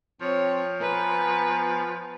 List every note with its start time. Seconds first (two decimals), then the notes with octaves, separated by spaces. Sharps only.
0.21 F3 C4 C#5
0.81 B3 B4 G#5 A#5